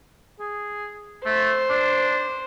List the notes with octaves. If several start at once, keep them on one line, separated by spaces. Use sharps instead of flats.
G#4
A3 C5
D4